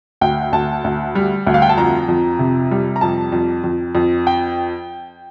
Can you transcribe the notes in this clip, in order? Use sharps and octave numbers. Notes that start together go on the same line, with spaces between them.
D2 G5
D2 A5
D2
G3
D2
F5
G5
A5
F2 A#5
F2
C3
G3
A#5
F2 A5
F2
F2
F2
G5